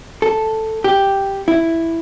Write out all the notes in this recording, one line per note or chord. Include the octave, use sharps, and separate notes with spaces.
A4
G4
E4